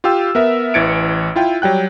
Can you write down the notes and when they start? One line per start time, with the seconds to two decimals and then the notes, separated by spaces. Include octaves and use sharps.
0.04 F4 G4 F5 G5 E6
0.35 B3 A#4 E5
0.74 A1 E3 G#6 A6 C#7 D7
1.36 E4 F4 G5
1.62 F#3 G3 G5 F#6